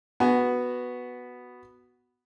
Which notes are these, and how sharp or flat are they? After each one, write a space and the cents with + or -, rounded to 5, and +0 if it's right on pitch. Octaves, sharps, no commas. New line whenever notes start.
B3 +0 F#4 +0 G#5 +20